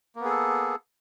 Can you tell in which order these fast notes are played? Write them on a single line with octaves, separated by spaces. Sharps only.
A#3 B3 G#4 A4